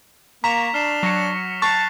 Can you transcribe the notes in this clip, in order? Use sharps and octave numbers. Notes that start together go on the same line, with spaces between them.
A#3 A#5 C#6 B6 E7 F7
D4 F6 C7 E7
F#3 C#6 A#6 C#7 E7
A5 C#6 F#6 C7 F7